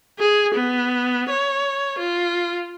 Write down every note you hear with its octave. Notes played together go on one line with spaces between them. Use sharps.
G#4
B3
C#5
F4